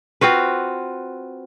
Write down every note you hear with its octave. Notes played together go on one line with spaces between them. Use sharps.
C4 F4 F#4 B4